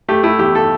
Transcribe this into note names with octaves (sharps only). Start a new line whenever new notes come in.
A3 G4
A3 E4
E2 G4
A4